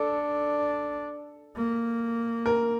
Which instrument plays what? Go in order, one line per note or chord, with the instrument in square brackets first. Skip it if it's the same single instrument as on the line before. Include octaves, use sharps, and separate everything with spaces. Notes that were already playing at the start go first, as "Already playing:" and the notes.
Already playing: [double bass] D4 [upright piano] A4
[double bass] A#3
[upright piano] A#4